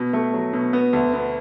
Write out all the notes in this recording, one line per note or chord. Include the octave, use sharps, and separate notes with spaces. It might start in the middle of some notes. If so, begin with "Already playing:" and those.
Already playing: B2
A3
F#3
B2
B3
D2
B3